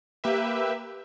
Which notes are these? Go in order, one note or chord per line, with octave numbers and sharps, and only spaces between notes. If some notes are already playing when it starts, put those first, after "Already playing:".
A#3 G4 B4 E5